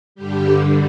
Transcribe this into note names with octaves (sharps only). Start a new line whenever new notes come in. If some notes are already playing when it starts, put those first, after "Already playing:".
G2 D3 G3 G4